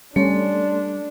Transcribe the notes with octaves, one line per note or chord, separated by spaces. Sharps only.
G3 A3 C#4 D4 A4 C6